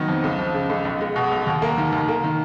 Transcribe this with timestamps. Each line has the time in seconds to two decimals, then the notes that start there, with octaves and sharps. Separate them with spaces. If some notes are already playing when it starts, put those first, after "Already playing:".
Already playing: D#3 F#3 B3
0.08 F2
0.24 C#2
0.39 F3
0.54 C#3
0.69 C#2
0.85 B1
1.01 G#3
1.16 B2
1.31 B1
1.47 D#2
1.62 A#3
1.78 D#3
1.92 D#2
2.08 A#3
2.24 D#3